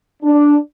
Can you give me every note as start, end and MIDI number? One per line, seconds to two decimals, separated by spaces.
0.23 0.57 62